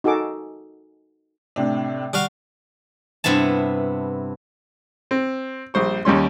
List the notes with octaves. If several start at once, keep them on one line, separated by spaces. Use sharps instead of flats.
D#4 F#4 G#4 A4 D6
A2 C3 D4
G3 F#4 F5
G2 C3 B3 E4 A5
C4
A#1 G3 C5 C#6
D#2 G3 C#4 C6